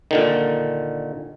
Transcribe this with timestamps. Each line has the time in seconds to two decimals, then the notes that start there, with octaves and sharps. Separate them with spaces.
0.11 A#2 D3 D#3